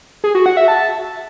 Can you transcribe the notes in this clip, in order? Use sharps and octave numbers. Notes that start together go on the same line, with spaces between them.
G#4
F#4
F#5
E5
A5